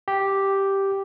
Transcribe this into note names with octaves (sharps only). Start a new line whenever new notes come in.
G4